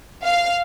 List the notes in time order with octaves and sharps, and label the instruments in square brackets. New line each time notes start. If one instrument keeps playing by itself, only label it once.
[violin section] F5